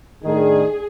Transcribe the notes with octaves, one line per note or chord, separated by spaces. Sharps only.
A2 D#3 D4 G#4